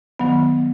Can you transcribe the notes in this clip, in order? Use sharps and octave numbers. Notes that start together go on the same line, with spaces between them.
D#3 F#3 B3